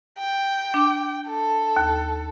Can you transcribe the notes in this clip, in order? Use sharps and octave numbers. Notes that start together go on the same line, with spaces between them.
G5
D4 D6
A4
D#2